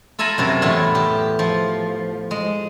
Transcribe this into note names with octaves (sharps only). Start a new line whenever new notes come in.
F4 A4 E5 G#5 A#5 B5
F#2 C3 A#4
E2 A2 B3 E4 F4
G4
F3
G#3